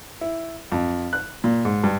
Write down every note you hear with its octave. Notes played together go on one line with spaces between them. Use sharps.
E4
F2
F#6
A#2
G#2
G2